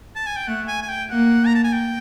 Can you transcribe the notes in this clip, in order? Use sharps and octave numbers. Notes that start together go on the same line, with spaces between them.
A5
G#5
G5
A3 F#5
G#5
G#5
G5
A#3 F#5
A#5
A5
G#5
G5